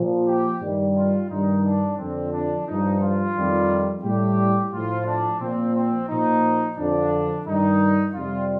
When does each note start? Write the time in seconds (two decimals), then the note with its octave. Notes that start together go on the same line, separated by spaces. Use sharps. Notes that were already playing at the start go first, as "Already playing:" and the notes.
Already playing: A#2 F3
0.28 G4
0.61 G2 D#3 G3
0.96 F4
1.29 G2 D#3 G3 D#4
1.64 D4
1.98 F2 D3 F3 C4
2.32 D4
2.66 G2 F3 D#4
3.01 F4
3.35 F2 D#3 G3
4.03 A2 G3 G4
4.72 A2 F3 F4
5.06 D4
5.40 A#2 F3 C4
5.75 C4
6.08 A#2 F3 D#4
6.77 F2 D3 F3 D4
7.46 G2 D#3 G3 D#4
8.14 F2 C3 G3 F4